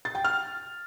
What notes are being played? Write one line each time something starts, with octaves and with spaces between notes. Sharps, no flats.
A6
G5
F6